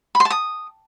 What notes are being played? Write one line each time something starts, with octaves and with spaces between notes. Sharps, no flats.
B5
C6
A5
D#6